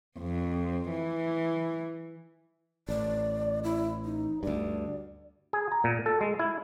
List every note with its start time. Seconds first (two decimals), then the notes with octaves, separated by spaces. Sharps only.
0.19 F2
0.91 E3
2.89 A1 D5
3.64 E4
4.05 D#4
4.43 D2 G2 D5
5.53 G#4
5.72 A#5
5.84 A#2
6.06 A4
6.21 G#3
6.39 E4